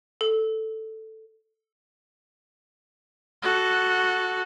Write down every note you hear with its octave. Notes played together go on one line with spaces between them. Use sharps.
A4
F#4 A4